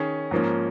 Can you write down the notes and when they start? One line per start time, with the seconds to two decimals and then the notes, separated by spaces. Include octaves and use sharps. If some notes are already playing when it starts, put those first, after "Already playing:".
Already playing: D#3 C#4 G#4
0.31 G#2 F3 A#3 C#4